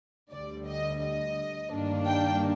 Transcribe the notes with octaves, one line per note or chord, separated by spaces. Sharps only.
D2 D3 G3 D5
D#5
D#5
G2 D#3 A#3 D4
G5